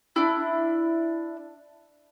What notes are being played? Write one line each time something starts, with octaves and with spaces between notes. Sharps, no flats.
D4 E4